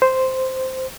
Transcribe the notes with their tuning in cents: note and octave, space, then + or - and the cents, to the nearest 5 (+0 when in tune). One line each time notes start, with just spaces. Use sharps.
C5 -5